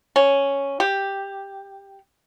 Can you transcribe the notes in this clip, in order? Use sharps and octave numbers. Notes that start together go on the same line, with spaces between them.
C#4
G4